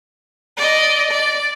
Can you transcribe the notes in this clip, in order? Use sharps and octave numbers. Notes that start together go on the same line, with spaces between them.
D5 D#5
D5